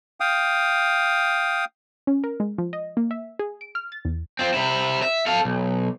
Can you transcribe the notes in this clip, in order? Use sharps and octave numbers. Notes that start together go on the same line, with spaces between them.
F5 G5 D#6
C#4
A#4
G#3
F3
D#5
A#3
E5
G#4
D7
F6
A6
E2
C4 F4
C3 E4
E5
A4 F5
B1